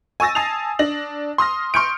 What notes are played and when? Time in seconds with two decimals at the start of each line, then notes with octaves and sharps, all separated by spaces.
0.20 G#5 C#6 E6 A6 A#6
0.35 G#5 A5 D#6 C7 F7
0.79 D4 A#6 F#7
1.38 C6 D#6 F6 A#6
1.74 C6 C#6 F6 G6 C#7 D7